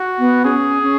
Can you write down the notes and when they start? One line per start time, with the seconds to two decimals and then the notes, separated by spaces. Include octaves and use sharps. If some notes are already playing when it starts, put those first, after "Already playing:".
Already playing: F#4
0.19 B3
0.45 C#4 G#4
0.83 C#4